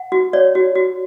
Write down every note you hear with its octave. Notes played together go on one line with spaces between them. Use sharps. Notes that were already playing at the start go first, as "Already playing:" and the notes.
Already playing: F#5
F#4
C#5 D5
F#4
F#4